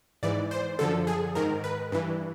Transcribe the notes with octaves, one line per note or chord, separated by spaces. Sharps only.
G#2 E3 D5
C5
F#2 D3 F3 A4
G#4
G#2 D#3 A#4
B4
G2 E3